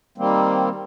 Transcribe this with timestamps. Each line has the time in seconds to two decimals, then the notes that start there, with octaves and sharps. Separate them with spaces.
0.18 D#3 G3 A#3 C4